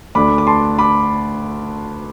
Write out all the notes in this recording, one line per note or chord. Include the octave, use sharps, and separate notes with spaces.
D2 D3 A3 D4 B5 D6
D6
A5 C6
B5 D6